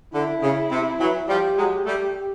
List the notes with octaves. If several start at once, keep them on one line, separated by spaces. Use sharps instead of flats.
D3 E4
C#3
C3
E3 F#3
F3 G3 G4
F#3 G#3
G3 A3 G4